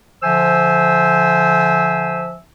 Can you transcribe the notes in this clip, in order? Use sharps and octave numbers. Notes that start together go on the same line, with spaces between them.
D3 F3 C5 E5 G#5 E6